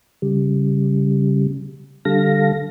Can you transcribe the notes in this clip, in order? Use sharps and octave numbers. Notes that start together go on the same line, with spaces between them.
C#3 G3
D3 G3 A4 F5 A#6